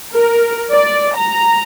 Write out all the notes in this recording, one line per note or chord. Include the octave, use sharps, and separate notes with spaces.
A#4
D5
A#5